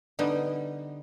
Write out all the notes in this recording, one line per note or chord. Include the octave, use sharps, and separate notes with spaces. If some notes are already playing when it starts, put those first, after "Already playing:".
D3 G3 B3 D#4